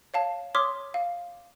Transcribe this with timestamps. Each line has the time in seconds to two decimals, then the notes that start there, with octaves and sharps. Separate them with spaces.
0.14 C#5 F5 A5
0.55 C#5 C6 D6 D#6 F6 B6
0.94 F5